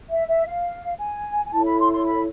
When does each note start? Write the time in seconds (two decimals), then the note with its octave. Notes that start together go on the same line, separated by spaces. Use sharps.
0.10 E5
0.28 E5
0.46 F5
0.99 G#5
1.45 G#5
1.52 E4 A4 C#5 A5
1.65 B5
1.79 C6
1.92 C6
2.05 B5